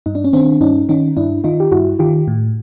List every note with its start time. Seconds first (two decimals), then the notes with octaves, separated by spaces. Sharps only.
0.06 G2 D#4
0.15 D4
0.24 C#4
0.33 D#3 C4 D4
0.61 G2 C#4 D#4
0.89 D#3 C#4 D#4
1.17 G2 D4 E4
1.44 D#3 D#4 F4
1.60 G4
1.72 G2 E4 F#4
1.99 D#3 F4 G4
2.28 A2